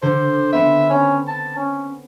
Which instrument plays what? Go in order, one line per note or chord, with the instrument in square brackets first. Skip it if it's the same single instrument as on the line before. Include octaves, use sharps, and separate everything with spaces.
[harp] D3 [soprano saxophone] C5
[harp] B3 C4 [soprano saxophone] E5
[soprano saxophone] C#4
A5
C#4